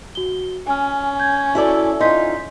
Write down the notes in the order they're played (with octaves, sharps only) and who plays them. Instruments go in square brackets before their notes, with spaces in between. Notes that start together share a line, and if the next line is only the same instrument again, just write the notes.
[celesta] F#4 G7
[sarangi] C#4 [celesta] G#5 F6
[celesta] G6 G#6
[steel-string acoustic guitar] E4 A4 D5 [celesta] F#4
[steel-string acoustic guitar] D#4 F4 [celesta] C6 G6 B6